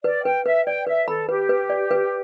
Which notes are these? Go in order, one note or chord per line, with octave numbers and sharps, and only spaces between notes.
B4 D5
B4 G5
B4 E5
D5 G5
B4 E5
A4 B5
G4 B4
B4
D5
B4